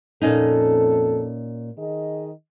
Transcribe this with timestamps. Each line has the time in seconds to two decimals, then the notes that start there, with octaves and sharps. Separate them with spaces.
0.22 F2 A#2 C#4 D#4 A4
1.78 D#3 G#4 D#5